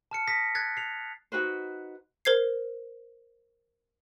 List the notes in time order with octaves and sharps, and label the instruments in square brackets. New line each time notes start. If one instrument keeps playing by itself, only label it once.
[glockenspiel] A5 F6 C#7
D#6 A#6 B6
F#6 G#6 A6 C7
C7 F7
[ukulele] D#4 F#4 B4 C5
[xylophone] A#4 C5 G#6 C7